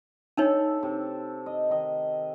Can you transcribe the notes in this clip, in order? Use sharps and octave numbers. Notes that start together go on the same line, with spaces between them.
D4 D#4 A4 C#5 E5
C3
D#5
D#3 D#5